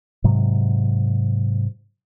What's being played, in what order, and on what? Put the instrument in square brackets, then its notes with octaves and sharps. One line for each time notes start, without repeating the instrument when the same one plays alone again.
[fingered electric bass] G#2 C3 F#3